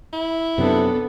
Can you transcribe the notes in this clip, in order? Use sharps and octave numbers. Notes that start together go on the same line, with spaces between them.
E4
F#2 C3 B3 D4 A4